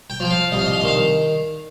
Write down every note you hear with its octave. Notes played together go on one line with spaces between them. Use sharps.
G5
F3 G5
F5
C2 D#5
F5
D#5
F5
D#5
D#3 F5